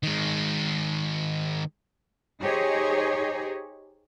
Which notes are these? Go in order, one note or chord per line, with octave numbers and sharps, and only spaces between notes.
D#3 G#3
D#4 G4 G#4 C5 C#5 D#5